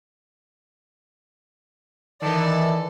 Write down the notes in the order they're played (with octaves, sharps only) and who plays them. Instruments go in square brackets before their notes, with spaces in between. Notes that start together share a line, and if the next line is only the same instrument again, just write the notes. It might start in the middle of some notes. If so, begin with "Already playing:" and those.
[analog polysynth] D#3 E3 [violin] A4 D5